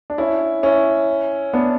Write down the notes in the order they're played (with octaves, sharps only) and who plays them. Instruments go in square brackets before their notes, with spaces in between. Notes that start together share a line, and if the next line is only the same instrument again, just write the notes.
[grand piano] D4
C#4 E4
C#4 E4
B3 D4